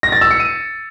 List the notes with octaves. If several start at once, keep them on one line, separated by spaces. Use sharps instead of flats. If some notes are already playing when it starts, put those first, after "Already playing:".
A#6
A6
E6
C#7
D#7